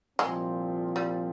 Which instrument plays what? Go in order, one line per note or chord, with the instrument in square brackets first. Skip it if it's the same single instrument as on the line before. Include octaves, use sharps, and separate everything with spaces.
[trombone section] C2 A#2 F3 C4 [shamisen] G#3
[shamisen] G3